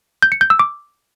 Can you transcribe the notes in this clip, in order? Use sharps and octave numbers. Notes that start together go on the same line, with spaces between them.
G6
C#7
G6
E6
D6